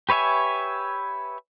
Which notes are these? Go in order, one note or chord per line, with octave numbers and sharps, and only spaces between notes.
G4 B4 C#5 E5 G#5